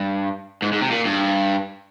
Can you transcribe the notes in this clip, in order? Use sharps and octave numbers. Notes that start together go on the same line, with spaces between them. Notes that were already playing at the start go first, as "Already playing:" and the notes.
Already playing: G2
G#2
G#2
C3
A#2
G2